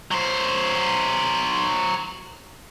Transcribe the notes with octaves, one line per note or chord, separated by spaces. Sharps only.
F#3 C5